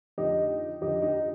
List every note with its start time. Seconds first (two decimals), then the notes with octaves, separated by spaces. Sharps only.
0.18 F2 D3 D#4 G4
0.81 F2 D3 D#4 G4
1.02 D#4 G4